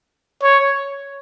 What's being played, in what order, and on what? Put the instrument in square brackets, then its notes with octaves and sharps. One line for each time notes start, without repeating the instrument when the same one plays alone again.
[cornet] C#5